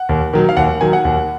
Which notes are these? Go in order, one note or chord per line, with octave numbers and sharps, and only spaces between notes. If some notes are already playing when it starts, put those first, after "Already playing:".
Already playing: F#5
D#2
D#3 F#3
F5
D#2 F#5
D#3 F#3 G#5
F#5
D#2